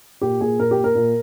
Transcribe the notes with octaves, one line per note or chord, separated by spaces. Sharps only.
A#2 G4
A#2 G#4
A#2 A#4
G4
A#2
A#4
A#2